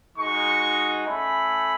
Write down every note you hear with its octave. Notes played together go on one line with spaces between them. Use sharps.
G#3 D#4 F#4 C#6
A3 C#4 E4 B5